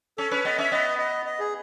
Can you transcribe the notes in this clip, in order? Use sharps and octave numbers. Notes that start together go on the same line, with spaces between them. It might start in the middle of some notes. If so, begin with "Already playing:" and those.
C#4 A4
C#4 B4
B3 D#5
C#4 E5
B3 D#5
D#5
D#5
G#4